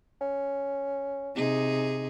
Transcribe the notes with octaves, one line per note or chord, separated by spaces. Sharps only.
C#4
C3 D#4 G#4